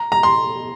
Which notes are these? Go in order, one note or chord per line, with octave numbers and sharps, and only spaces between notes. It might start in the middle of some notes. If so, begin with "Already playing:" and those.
Already playing: A#5
A#5
C6